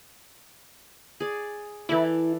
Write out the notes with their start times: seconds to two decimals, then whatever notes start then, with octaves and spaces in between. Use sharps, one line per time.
1.20 G#4 D5
1.89 E3 E4 A4 D5